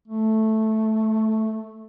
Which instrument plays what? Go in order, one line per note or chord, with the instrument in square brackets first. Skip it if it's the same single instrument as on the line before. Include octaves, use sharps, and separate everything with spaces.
[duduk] A3